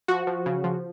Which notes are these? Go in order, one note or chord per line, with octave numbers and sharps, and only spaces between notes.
F3 F#4
F3
C#3
F3